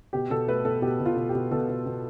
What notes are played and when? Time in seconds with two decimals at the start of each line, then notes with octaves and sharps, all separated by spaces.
0.13 B2 G4
0.30 B2 A4
0.47 A3 B4
0.65 B2 A4
0.82 B2 G4
1.00 B2
1.06 F4
1.16 B2
1.29 G4
1.35 B2
1.51 B2 A4
1.69 B2
1.86 B2